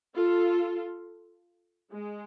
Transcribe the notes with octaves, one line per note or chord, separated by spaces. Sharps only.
F4 A4
G#3